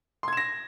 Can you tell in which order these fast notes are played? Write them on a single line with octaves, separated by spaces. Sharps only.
C6 G#6 E7 A#6